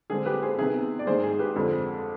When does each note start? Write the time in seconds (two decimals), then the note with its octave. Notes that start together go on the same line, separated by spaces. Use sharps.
0.10 D3 G#3 C4 G#4
0.26 G4 B4
0.42 G#4 C5
0.58 C3 D#3 B3 G#4
0.99 D5
1.07 G#2 D#3 G#3 G#4 C5
1.23 G#4
1.39 G4 B4
1.55 F2 D3 G#3 C4